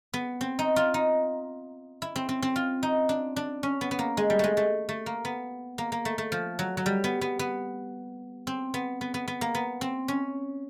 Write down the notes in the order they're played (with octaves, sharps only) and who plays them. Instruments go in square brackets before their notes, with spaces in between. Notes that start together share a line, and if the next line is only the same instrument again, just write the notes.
[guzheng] B3
C4
D#4
F4
D#4
E4
C4
C4
C4
F4
D#4
D4
D4
C#4
B3
B3
A#3
G#3
G3
G#3 A3
A3
A3
A#3
B3
A#3
A#3
A3
A3
F3
F#3
F#3
G3
B3
B3
B3
C4
B3
B3
B3
B3
A#3
B3
C4
C#4